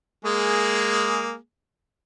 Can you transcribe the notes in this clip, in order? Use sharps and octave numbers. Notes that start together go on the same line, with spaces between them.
G#3 A#3 G#4